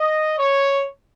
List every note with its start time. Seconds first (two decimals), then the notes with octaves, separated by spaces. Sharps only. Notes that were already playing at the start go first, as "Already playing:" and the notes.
Already playing: D#5
0.38 C#5